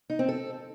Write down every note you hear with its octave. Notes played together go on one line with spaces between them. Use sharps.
D#4
C4
A4